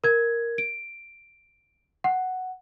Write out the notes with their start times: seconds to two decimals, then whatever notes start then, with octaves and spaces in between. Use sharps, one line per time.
0.04 A#4 G#6
0.58 D7
2.04 F#5